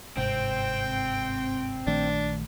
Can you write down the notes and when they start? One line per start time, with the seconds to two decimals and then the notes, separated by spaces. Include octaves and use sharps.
0.17 G1 G#2 C3 C4 G5
1.87 A#1 D#3 A3 D4